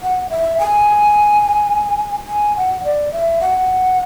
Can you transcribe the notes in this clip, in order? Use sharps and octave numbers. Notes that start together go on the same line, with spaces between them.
F#5
E5
G#5
G#5
F#5
D5
E5
F#5